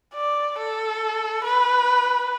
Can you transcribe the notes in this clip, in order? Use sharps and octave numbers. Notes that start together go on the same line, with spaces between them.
D5
A4
B4